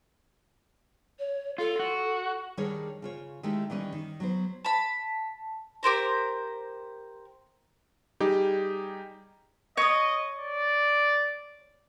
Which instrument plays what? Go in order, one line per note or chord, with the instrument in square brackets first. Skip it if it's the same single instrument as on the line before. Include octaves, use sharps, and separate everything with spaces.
[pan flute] C#5
[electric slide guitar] F4 [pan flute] A4
[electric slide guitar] F#4
[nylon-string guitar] D#3 G3 D4 G#4 A#4 C#5
C#3 F4 C#5
D#3 G#3 A3 E4 G4
D#3 E3 G3 C#4 D#4
D#3
F#3 B3 C5
[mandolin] A5 B5
G4 A#4 C5 A#5
[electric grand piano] G3 D#4 G4 G#4
[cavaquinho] C#5 D#6 [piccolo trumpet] D#5
[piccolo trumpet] D5